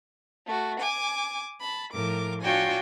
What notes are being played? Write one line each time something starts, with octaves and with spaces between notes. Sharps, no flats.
A3 F#4
G#5 D6
A5 B5
A2 F3 A#4 D6
D4 F4 F#4 C#5 G5 G#5